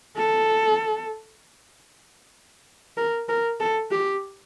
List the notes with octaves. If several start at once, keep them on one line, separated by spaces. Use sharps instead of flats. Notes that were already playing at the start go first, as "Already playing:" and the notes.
A4
A#4
A#4
A4
G4